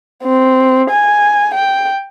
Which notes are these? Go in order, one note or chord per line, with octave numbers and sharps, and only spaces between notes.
C4
G#5
G5